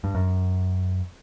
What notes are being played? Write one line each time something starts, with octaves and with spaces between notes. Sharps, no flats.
G2
F#2